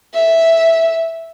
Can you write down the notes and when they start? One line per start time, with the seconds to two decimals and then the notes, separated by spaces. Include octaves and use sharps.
0.14 E5